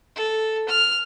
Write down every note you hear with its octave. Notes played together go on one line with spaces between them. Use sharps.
A4
F6